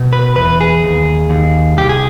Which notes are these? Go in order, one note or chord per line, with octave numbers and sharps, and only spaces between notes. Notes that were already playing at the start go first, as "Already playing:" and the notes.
Already playing: B2
B4
E2 B4
G#4
D#2
D#2
C2 G4
G#4